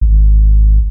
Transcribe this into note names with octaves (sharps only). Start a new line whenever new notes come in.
G#1